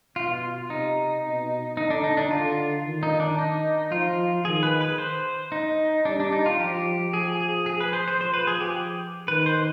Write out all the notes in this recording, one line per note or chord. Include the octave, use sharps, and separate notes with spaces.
B2 F4
F4
C3 D#4
B2
D3 D#4
D4
D#4
D4
D3 F4
D#3
D#4
D4
D#4
F3 F4
D#3 G#4
B4
B4
C5
D#4
G3 D4
D4
D#4
F4
F3 G4
F3 G#4
G#4
G#4
B4
C5
C5
F3 C5
B4
G#4
G4
D#3 B4
C5